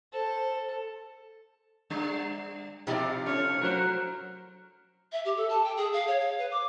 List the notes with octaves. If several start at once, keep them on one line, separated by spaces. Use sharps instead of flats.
A4 C5
G3 D4
C3 F3 D#4 D5 F5
C#4 F4 A4 C#5 F6
F#3 A#4 C5 A#5 F6 F#6
E5
G4
A4
A5
G5
G#4
F5
C#5
F5
B4
D6